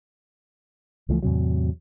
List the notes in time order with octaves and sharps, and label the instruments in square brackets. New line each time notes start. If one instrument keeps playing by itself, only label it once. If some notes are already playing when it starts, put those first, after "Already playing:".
[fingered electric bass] C#2 E3 F3 A3
E2 A2 C3 F#3